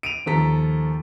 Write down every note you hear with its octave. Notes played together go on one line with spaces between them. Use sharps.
D7 D#7 F7
D#2 F3 A4 A#5 B6